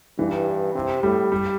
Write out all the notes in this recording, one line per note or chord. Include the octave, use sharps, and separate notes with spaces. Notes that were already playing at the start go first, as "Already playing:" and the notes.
G2 E3
C3
A2 G3
G3